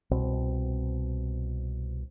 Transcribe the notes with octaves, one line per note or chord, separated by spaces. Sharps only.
C2 B2 C4